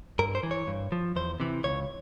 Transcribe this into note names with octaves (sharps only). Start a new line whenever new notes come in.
G2 A#4
C5
E3
C#5
G2
F3
E2 C5
C3 E3
C#2 C#5